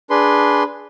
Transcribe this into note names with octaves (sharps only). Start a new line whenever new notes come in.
D4 G#4 B4 C6